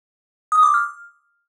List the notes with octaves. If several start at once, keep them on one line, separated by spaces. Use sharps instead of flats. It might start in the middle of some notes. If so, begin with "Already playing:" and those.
D#6
D6
F6